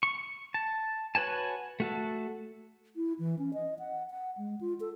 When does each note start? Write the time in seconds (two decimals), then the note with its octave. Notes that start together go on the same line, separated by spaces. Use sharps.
0.03 C#6
0.54 A5
1.15 F#4 B4 C#5 G#5 A5
1.80 A3 F#4 A4
2.96 E4
3.19 E3
3.39 C#4
3.54 D#5
3.79 F#5
4.10 F#5
4.37 G#3
4.61 F4
4.80 A4